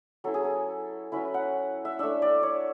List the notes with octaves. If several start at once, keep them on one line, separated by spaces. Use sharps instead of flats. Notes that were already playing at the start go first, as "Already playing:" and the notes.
F#3 C#4 E4 A4
G#4
A4
F#3 C#4 E4 B4
F#5
E5
A3 D4 E5
D5
C#5